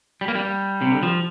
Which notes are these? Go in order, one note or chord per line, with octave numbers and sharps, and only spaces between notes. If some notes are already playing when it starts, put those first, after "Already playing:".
G3
A#3
G3
C3
D3
F3